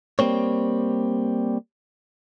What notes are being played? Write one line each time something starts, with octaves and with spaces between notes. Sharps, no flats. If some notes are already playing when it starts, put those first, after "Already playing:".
G3 A#3 C4 C#5